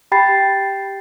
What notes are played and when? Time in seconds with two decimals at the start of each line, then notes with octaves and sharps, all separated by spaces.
0.12 G4 G5 B5 A6 C7